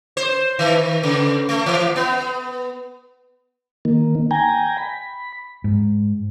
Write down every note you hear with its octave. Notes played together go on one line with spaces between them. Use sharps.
C5
D#3
C#3
A3
E3
B3
D#3 A#3
G5 G#5 A#5
B5
G#2